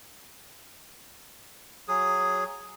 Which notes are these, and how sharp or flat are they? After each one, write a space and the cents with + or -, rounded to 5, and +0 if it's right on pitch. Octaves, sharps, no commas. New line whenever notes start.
F#3 +0 G#4 +0 D#6 +0